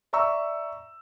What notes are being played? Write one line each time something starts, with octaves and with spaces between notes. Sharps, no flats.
D5 E5 A#5 C#6 E6